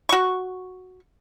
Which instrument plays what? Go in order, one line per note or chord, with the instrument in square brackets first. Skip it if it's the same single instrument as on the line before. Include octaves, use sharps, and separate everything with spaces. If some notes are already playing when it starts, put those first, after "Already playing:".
[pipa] F#4 C#6